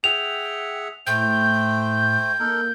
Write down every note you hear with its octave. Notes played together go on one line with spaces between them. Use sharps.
G#4 E5 F#5 G5 F7
A2 A3 C5 G5 G6
A#3 D#4 A4 A#4